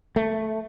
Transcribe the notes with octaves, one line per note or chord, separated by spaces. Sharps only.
A3